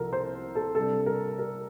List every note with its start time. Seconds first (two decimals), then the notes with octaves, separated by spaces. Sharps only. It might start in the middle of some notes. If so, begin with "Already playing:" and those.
Already playing: C2 C3 F3 A4 A#4
0.13 C5
0.55 A4
0.75 C3 G3 D4 A4
1.06 A#4
1.38 A#4